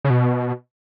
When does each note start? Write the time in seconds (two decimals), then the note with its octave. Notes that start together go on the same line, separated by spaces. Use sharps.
0.04 C#3
0.10 B2